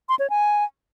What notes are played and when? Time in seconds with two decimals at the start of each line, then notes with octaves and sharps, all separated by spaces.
0.09 C6
0.19 C#5
0.30 G#5